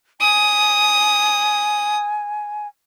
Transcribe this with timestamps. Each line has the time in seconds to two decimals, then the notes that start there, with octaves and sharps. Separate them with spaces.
0.21 G#5 D#6